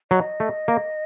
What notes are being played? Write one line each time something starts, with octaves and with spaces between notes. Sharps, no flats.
F#3 D#5
A3
A#3